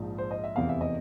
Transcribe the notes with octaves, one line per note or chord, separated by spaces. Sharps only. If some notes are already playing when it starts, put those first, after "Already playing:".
Already playing: A#1 G#2 F3
C5
D#5
E5
F1 E2 C3 E3 F5
E5
D#5